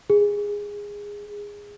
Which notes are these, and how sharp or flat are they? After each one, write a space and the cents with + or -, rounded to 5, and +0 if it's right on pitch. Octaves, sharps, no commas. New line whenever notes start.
G#4 -15